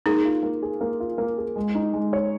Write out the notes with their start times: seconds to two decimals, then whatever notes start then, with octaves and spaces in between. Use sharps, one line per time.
0.06 A#3 D#4 G#4
0.25 F4
0.43 A#3
0.62 G#4
0.81 A#3
1.00 F4
1.18 A#3
1.38 G#4
1.56 G#3
1.75 D#4
1.93 G#3
2.13 C#5